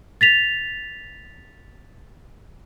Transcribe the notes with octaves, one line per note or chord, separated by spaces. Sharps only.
A6 B6 F7